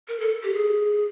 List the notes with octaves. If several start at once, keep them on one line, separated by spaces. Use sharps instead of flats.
A#4
A4
G4
G#4